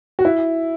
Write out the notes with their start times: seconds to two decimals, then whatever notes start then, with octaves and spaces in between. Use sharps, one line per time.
0.19 F#4
0.25 E4